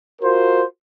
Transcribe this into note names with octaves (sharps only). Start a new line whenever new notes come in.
F4 F#4 A#4 C5